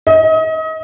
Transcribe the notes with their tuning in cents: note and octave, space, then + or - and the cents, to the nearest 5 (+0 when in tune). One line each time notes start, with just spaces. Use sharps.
D#5 +35